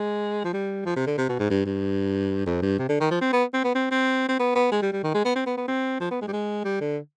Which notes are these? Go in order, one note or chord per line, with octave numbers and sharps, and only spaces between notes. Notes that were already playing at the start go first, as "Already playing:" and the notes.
Already playing: G#3
F3
G3
F3
C3
D3
C3
B2
G#2
G2
G2
F2
G2
C3
D3
D#3
F3
C4
B3
C4
B3
C4
C4
C4
B3
B3
G#3
G3
G3
D#3
G#3
B3
C4
B3
B3
C4
F3
B3
G#3
G3
G#3
G3
D3